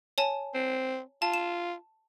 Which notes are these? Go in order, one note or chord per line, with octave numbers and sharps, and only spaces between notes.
C#5 G#5 A5
C4
F4 A5
E7